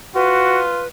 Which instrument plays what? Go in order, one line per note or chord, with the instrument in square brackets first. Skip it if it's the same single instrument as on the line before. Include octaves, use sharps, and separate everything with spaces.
[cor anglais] F4 [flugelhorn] F#4 [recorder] B4